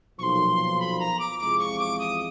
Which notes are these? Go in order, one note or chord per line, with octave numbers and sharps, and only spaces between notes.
B1 A#2 F3 C6 C#6
B5
A#5
D6
E2 C3 F3 G#3 D6
C#6
D6
D#6